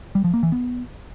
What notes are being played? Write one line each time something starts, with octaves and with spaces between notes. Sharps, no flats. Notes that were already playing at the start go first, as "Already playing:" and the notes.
G3
F3
A#3
E3
B3